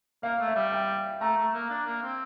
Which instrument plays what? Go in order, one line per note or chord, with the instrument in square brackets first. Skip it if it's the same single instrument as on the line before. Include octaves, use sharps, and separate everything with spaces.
[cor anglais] A#3 [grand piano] F5
[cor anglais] A3
[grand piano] E5
[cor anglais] G3
[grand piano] G5
[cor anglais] A3 [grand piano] A#5
[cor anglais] A3
A#3
D4
A#3
C4